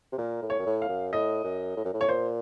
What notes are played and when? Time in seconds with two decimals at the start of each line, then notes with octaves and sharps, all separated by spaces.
0.13 C3
0.18 A#2 A#4
0.42 A2
0.50 C#5
0.59 F#2
0.66 A2
0.82 F5
0.89 F#2
1.13 A2 D#5
1.44 F#2
1.77 A2
1.85 F#2
1.94 A2
2.01 C#5
2.09 A#2 C5